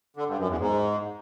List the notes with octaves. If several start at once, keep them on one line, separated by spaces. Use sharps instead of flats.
D3
G2
F#2
E2
G#2